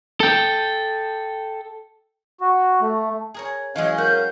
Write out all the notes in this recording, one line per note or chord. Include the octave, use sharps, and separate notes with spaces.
A4 G5
F#4
A3
G#4 A#4 C#5
E3 F#3 G#3 C#4 D#5 F5 F#5
F#4 A#4 G6